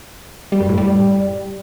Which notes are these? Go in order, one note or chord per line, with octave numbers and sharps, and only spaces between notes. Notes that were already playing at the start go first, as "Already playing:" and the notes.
G3
F#2
A2
G3